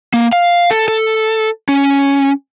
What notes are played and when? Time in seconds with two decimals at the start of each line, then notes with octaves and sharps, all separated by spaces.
0.14 A#3
0.33 F5
0.71 A4
0.88 A4
1.69 C#4